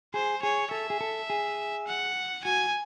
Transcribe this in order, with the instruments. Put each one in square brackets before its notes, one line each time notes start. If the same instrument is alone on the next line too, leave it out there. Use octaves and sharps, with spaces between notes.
[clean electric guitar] G#4 [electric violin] C5
[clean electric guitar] G#4 [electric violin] C#5
[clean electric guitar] A4 [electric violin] E5
[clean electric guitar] G#4
A4
G#4
[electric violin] F#5
[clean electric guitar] F#4 [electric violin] G#5